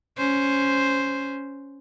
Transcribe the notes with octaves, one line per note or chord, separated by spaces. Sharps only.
C#4 C5